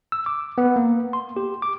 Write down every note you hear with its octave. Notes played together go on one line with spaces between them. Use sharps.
E6
D6
B3
A#3
C6
G4
D6